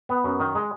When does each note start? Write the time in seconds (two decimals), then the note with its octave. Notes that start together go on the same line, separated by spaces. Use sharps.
0.09 B3
0.24 F#2
0.40 D#3
0.55 G#3